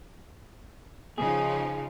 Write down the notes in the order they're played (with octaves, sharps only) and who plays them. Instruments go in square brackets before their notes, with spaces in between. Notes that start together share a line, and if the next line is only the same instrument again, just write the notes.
[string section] C#3 F3 D#4 [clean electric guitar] G#4